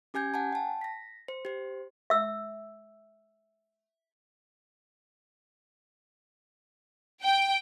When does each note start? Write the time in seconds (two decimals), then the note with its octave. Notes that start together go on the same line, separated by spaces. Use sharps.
0.14 C#4 G4 G#5 G6 G#6
0.34 F#5 G#5 A5
0.53 G5 A5
0.81 A#6 B6
1.28 C5
1.45 G4 C5
2.10 E5 E6
7.23 G5